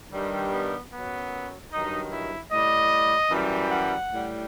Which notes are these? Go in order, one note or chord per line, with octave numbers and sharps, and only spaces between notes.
G2 D#3 G3
B3
F#2 F#3 B3
G2 D#3 F#3 D#4
E4
A2 G3 D#5
F#2 E3 G3
F#5
A2 G3